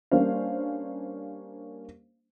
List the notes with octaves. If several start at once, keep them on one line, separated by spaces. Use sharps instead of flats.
G3 A#3 C#4 D4 C5 F5